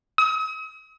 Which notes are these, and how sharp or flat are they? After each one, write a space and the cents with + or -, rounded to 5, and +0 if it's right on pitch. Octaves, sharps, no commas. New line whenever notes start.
D#6 +45